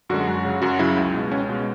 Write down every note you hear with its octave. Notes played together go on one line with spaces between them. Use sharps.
F#2 D3 G#3 F#4
F#2
C#3 F#3
F#2 F#4
C#3 F#3 E4
C#2
B2 G#3
C#2 C#4
C#4
B2 G#3